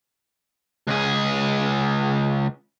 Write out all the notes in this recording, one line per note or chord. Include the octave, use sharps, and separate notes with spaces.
C#2 G#4